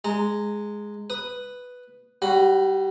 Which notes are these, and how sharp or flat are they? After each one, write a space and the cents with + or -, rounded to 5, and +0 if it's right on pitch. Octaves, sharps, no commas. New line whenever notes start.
G#3 +0 A#5 -30
B4 +0 D#6 +0
G3 -25 F#4 +5 B5 +20